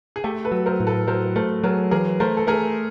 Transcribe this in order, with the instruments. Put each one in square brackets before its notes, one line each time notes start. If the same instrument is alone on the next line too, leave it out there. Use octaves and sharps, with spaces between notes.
[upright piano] G#4
[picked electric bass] A3 [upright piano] G4 A4
[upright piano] A4 B4
[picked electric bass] F#3
[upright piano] A#4 C5
[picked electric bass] A2
[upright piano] A4 B4
[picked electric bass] F#3 [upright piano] A#4 C5
[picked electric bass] A3 [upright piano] A#4 C5
[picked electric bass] F#3 [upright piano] G#4 A#4
[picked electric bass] E3 [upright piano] G#4 A#4
[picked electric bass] A3 [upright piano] A#4 C5
[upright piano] A4
[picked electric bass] A3 [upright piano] G#4 A#4